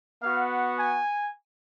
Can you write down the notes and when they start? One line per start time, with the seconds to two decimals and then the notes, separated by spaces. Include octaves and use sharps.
0.21 B3 F#4 F5
0.78 G#5